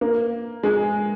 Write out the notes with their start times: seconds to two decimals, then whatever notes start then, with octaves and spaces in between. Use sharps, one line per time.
0.01 A#3
0.63 G#3